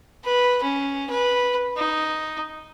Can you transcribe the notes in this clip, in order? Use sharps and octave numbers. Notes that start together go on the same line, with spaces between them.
B4
C#4
B4
D#4